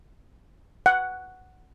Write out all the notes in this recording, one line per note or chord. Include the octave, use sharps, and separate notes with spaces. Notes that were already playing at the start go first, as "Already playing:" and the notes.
F#5